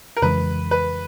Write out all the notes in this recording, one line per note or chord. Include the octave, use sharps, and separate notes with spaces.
A#4
F2 C#3 E3 G#3 B4
B4